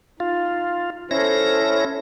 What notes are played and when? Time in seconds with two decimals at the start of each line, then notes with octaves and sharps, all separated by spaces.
0.20 D#4 F4
1.11 C#4 E4 A4 C5 A#6